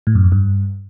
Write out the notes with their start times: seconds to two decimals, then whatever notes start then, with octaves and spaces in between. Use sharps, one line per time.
0.07 A2
0.15 F#2
0.24 F2
0.32 G2